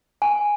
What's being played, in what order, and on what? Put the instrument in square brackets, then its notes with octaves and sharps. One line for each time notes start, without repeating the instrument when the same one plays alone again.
[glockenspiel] G#5